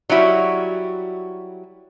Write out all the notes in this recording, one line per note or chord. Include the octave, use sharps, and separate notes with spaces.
F#3 G3 E4 F#4